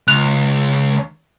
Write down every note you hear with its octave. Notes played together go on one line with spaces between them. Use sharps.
C#2 F#6 F7